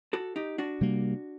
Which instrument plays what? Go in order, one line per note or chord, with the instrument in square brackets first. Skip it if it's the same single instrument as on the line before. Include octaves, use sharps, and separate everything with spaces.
[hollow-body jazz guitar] F#4 A4
D#4 G4
D4 F#4
[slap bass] C3 G3 A#3